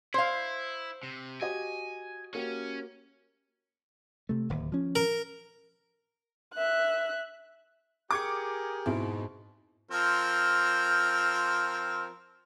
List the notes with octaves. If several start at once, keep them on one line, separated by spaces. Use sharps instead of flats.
E4 C5 F5
C3
F#4 G4 D#5 G#5
A#3 C#4 F#4 G4
C3 A3
D1 D#2
F3 C#4
A#4
E5 F#6
G4 G#4 A#4 D6 G#6 C#7
F2 G#2 B2 E4 D7
F3 C4 A#4